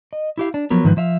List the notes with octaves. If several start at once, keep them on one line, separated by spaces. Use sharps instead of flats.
D#5
E4 G4 F5
D4
F3 F#3 B3 A#4
G#2 D#3 F3 D4 B4
F3 E5 F5